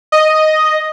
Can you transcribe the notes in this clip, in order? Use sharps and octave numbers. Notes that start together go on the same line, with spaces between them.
D#5